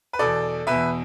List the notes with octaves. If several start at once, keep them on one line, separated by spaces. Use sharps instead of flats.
B4
E2 B2 A4 D5
E2 B2 B4 E5